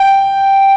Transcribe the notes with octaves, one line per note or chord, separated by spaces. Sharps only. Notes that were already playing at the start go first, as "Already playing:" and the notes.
Already playing: G5